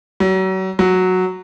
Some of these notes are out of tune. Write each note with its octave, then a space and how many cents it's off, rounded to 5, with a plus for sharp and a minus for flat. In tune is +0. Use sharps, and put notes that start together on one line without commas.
F#3 +35
F#3 -5